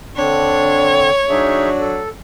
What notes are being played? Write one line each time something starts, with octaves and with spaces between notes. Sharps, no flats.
D3 C4 D4 C#5
F#3 D4 D#4 G#4 E5
A4